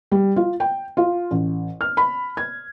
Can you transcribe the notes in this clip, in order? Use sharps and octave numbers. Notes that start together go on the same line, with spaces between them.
G3
F4
G5
F4
A1
F6
B5
G#6